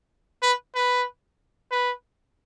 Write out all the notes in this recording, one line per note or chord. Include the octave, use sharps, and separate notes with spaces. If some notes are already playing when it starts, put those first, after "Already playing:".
B4
B4
B4